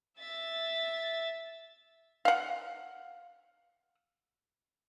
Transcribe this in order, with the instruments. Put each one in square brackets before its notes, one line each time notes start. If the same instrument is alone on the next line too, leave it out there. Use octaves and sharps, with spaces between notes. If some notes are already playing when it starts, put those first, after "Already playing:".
[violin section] E5 A6
[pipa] F5 F#5